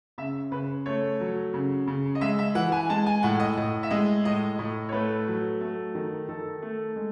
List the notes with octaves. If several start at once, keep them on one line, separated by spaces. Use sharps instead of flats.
C#3 E5
C#3 B4
A3 C#5
F#3
C#3
C#3
D#5
G#3 E5
E5
E3 F#5
G#5
G#3 A5
G#5
A2 F#5
D#5
A2 D#5
E5
G#3 D#5
A2 D#5
A2 D#5
C#5
A3 B4
F#3
A3
D#3
D#3 A4
A3
G#3